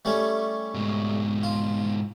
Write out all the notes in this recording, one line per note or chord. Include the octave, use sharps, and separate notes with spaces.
G3 A3 C#4
G#2 B2
F4